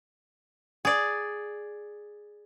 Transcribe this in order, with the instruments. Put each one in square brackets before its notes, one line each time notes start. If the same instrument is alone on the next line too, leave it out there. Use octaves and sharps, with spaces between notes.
[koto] G#4 D5